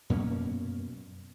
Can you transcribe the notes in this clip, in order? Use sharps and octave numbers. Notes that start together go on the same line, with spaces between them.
F#2 B2 A#3 C#4